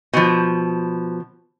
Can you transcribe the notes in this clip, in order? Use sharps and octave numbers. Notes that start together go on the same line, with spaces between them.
B2 F3